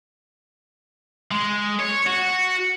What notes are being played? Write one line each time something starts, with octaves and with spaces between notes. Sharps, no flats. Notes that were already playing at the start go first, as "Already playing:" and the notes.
G#3
C#5
F#4